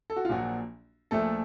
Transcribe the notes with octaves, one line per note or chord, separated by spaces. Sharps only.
A4
F#4
F4
A#1 A#2 F3 F#3 F#4
A#1 A#2 F3 A3 A4